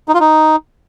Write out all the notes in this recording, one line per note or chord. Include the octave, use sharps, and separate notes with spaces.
D#4
F4
D#4